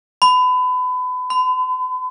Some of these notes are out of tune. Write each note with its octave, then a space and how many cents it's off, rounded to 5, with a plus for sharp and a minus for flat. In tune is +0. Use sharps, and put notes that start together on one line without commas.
B5 +30
B5 +45